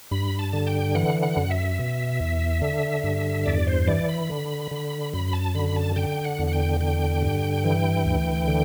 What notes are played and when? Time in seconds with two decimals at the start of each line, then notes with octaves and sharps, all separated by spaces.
0.11 G2 B5
0.39 A5
0.53 D3
0.67 G5
0.95 E3 F#5
1.22 F#5
1.36 F#2
1.50 E5
1.79 B2
2.20 E2
2.61 D3
3.04 G2
3.46 E2 D5
3.67 C5
3.87 E3 D5
4.09 B5
4.30 D3
4.71 D3
5.13 F#2 B5
5.33 A5
5.55 D3 B5
5.76 A5
5.96 D3 G5
6.24 F#5
6.39 E2
6.47 F#5
6.53 G5
6.80 D3 G5
7.22 G2
7.64 E3
8.05 D2
8.48 D3